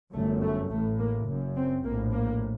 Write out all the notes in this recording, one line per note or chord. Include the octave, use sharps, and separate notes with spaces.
G1 F#2 A3
A3
A1 A2 A3
A#3
F#1 F#2
C4
A#1 A2 A#3
A#3